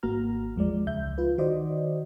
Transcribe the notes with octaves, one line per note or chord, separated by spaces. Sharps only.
G#1 A#3 F#4 A#5 F6
E2 F3 G#3 D5
C#2 E5 G6
F4 B4
D#3 F#4 C5 D5 D#5